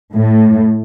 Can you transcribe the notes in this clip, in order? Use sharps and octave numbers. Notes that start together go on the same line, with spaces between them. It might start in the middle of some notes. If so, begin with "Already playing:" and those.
A2